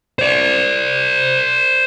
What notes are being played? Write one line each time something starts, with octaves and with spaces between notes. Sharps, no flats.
C5 D5